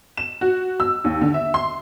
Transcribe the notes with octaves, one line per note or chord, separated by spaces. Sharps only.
E7
F#4
E6
D#2
D3
E5
C6